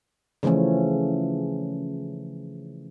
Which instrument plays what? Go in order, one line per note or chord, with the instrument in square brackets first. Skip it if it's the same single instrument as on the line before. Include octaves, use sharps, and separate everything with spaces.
[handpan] C#3 E3 F3 A3 C#4